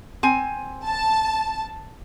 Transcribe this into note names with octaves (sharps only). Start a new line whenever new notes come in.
C4 G#5
A5